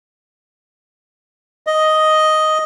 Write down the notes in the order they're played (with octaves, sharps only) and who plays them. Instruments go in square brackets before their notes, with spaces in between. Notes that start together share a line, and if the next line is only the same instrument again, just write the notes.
[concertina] D#5